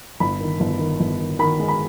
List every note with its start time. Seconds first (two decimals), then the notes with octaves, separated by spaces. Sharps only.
0.20 G1 B5
0.40 D#3
0.60 G1
0.79 D#3
1.00 G1
1.19 D#3
1.39 D#3 B5
1.59 G#3
1.68 B5